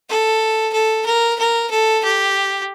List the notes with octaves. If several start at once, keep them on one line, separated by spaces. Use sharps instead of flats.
A4
A4
A#4
A#4
A4
G4